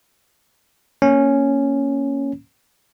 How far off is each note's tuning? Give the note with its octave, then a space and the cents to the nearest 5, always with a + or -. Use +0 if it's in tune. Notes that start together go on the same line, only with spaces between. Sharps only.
A#3 +0 C#4 +0